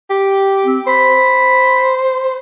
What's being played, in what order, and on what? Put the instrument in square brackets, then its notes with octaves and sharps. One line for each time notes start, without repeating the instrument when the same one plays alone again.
[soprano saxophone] G4
[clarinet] C4
[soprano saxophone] C5 [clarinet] B5